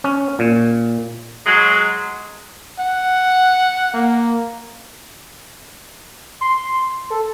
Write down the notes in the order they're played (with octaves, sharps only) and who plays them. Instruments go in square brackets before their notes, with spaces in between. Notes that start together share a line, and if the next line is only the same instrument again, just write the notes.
[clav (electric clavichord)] C#4
A#2
[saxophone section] F#3 G#3
[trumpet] F#5
A#3
[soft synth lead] C6
A4